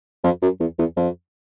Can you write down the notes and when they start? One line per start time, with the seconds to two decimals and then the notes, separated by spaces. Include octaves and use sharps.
0.24 F2
0.42 F#2
0.60 E2
0.79 E2
0.97 F2